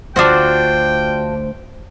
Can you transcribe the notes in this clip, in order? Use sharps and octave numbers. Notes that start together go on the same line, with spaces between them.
D2 D4 F4 F#4 C5 G5